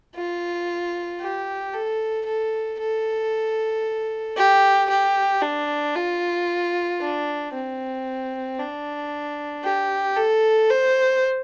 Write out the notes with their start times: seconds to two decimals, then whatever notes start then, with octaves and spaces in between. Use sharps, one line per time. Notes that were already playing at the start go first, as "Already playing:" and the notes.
0.15 F4
1.20 G4
1.73 A4
2.25 A4
2.79 A4
4.37 G4
4.89 G4
5.42 D4
5.95 F4
7.00 D4
7.53 C4
8.59 D4
9.64 G4
10.16 A4
10.70 C5